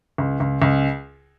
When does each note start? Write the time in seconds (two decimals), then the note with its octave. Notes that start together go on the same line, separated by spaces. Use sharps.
0.18 C#2
0.40 C#2
0.62 C#2